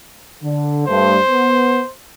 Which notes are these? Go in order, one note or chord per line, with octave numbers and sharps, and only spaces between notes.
D3
G2 A3 C5
B3